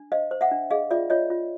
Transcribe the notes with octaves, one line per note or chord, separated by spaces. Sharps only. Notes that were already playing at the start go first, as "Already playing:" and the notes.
Already playing: D4
C5 D#5 F5
C5
E5 F#5
D4
G#4 D#5 F5
F4 D5 E5
F4 C#5 D#5
F4